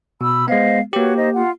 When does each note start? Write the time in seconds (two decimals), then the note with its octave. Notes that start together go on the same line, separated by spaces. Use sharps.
0.21 B2 B5 E6
0.48 G#3 B3 C5 D#5 F5
0.93 A#3 F#4 G4 B4 C#5
1.16 D#4 C5 D#5
1.34 F4 F#5